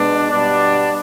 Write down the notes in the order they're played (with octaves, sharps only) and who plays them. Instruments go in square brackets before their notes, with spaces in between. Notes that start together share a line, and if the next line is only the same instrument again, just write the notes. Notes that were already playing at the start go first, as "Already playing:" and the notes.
Already playing: [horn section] B2 G#3 B3 D4
B2 G3 B3 D4